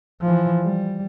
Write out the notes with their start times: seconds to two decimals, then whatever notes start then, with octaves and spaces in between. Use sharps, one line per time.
0.22 E3 F3
0.62 G3